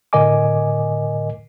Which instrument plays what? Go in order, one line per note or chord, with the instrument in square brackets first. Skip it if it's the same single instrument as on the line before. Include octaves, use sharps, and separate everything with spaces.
[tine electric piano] A2 D3 A#4 D#5 G#5 D6